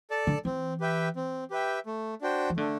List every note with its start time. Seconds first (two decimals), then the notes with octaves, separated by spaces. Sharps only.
0.10 A4 D5 A5
0.27 D3
0.45 E3 C4
0.80 G4 B4 E5 G5
1.16 C4
1.51 G4 B4 E5 G5
1.86 A3
2.21 D4 F#4 C5 G5
2.50 E3
2.57 D3 A3